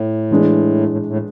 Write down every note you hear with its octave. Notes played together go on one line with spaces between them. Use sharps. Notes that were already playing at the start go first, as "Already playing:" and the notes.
Already playing: A2
E3 G#3 D4
A2
A2